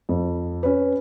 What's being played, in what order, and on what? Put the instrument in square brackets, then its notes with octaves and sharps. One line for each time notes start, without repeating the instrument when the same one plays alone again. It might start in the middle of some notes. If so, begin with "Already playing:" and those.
[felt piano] F2
C#4 B4